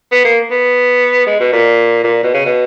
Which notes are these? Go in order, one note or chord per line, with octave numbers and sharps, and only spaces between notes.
B3
A#3
B3
G#3
B2
A#2
A#2
B2
C#3
B2